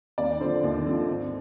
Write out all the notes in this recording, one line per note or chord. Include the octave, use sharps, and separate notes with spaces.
D#2 D5
D3 F3 C5
D#2
D3 F3
G#1